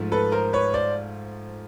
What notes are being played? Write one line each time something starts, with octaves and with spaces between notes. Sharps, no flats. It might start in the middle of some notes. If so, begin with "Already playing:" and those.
Already playing: G#2 F3 A3
A4 B4
A#4 C5
B4 C#5
C5 D5